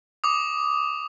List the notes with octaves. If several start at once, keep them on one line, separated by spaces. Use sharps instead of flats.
D6 D#6